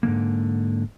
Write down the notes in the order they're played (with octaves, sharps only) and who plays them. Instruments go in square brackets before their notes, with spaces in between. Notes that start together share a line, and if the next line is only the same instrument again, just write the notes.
[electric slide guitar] G#2 D3 E3 A#3